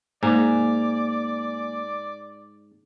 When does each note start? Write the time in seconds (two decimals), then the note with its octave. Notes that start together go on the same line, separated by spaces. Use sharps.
0.23 G#2 A#3 D5 G#5 A#5